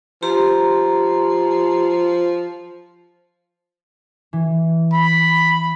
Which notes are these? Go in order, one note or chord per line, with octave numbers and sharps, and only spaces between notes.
F3 G4 A#5 C6
E3
B5